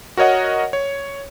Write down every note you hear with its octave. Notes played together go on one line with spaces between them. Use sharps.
F#4 A#4 C#5 D#5 F#5
C#5